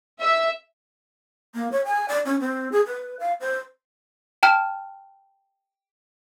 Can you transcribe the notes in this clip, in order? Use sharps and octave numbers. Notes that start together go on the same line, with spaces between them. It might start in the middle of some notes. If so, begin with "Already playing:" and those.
E5
A#3
C#5
G#5
D5
C#4
C4
G#4
B4
F5
C5
G5 A5 F6